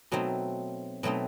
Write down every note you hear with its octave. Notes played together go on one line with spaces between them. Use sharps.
B2 F#3 A3 C4 D#4
B2 F#3 A3 C4 D#4